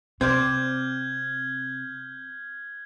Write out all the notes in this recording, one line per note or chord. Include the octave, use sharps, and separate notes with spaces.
C3 C4 C5 D5 F6 G6 G#6